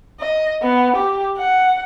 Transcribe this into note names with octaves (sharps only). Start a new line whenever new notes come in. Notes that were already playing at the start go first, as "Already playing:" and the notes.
D#5
B3
G4
F#5